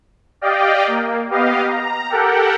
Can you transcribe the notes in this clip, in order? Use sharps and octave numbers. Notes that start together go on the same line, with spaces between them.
G4 D5 D#5 F5 G5
A#3
B3 G4 D#5 F5
A#5
G4 A4 A#4 F#5 G5